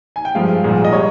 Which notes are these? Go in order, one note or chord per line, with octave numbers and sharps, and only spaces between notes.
G#5
G5
G2 F3 G#3 F5
C2 A#2 F3 G#3
D#5
G3 C#5